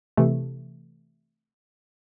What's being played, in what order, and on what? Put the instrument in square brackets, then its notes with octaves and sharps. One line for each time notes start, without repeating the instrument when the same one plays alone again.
[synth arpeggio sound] C3 E3 A3